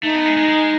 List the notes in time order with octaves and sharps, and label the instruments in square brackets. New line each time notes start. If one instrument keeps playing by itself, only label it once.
[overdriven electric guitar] A3 [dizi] D#4
[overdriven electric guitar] B3
G#3
G#3
G#3